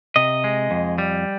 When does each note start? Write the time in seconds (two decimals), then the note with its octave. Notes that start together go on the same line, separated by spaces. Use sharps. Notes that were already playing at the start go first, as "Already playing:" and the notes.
0.16 C3 D#5
0.44 G#3
0.71 F2
0.98 G3